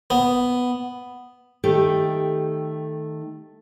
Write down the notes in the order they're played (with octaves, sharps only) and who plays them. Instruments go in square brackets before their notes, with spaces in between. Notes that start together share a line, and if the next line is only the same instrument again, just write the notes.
[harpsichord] B3
[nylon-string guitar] D#3 A3 G4 A4